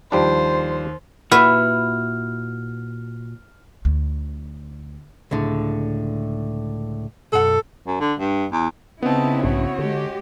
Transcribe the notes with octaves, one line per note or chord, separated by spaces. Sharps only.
D#2 F3 G3 D4 C5
A#2 E4 F#4 B4 F6
D2
C#2 A2 D3
B1 F#2 A4 F#5
F#2
D3
G2
E2
C#3 B3 C4 D#4 E4 A5
B1 G#2 D4 F#4 C#5
D3 G#3 G4